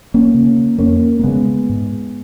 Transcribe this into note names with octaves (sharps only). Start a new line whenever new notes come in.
A#3 C#4
C#3
F2 A#3 C#4
A#3
C#3 G#3 B3
G#2